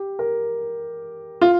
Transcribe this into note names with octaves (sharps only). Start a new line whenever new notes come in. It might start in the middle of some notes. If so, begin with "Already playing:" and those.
Already playing: G4
A#4
F4